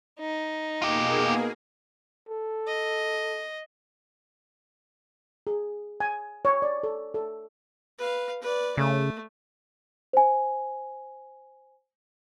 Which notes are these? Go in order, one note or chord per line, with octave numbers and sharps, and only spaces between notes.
D#4
B2 A#3 F4 G4 G#4
A4
D#5
G#4
G#5
C#5
D5
A4
A4
B4 F5
B4 D5
C#3 A3
C5 G#5